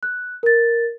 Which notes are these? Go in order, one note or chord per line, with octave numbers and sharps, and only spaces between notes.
F#6
A#4 A6